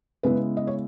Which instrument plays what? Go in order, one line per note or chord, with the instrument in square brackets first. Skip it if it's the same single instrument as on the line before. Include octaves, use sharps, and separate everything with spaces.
[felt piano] C#3 G#3 B3 E4 B4
D#5
C#5